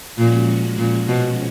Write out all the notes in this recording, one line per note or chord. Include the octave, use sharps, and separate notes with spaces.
A#2 F3 G#3 C#4 F#4
A#2
B2